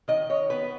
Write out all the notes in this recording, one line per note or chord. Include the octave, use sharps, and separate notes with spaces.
D#3 D#5
C#5
B3 B4